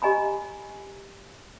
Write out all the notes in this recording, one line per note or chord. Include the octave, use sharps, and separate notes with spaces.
G4 D#5 G#5 A#5 B5